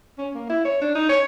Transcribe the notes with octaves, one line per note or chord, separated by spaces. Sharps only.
C#4
A#3
E4
C#5
D4
D#4
C#5